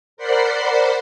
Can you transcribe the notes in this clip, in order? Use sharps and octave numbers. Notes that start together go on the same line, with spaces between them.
A#4 C5 D5 F#5 B5 C7